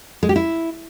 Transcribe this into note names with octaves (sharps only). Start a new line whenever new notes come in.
G#3
G4
E4